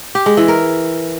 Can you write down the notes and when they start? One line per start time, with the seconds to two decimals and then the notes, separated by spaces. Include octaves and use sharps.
0.15 G4
0.26 G#3
0.37 E3
0.48 A#4